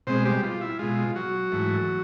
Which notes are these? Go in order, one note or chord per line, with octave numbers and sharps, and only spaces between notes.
B2 G#3 C4 C5
G3 G4
F4
E4
B2 G#3 F4
F#3 F#4
G#2 E3 A3